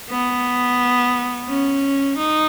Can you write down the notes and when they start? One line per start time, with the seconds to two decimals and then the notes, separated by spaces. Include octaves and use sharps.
0.10 B3
1.48 C#4
2.18 D#4